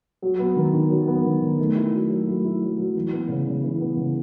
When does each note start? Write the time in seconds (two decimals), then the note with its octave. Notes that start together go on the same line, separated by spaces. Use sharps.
0.22 F#3
0.39 B3
0.57 D#3
0.73 D#3
0.90 F#3
1.08 B3
1.24 D#3
1.42 D#3
1.59 A3
1.75 E4
1.93 F#3
2.10 F#3
2.27 A3
2.44 E4
2.62 F#3
2.78 F#3
2.95 E3
3.13 B3
3.29 C#3
3.47 C#3
3.64 E3
3.81 B3
3.97 C#3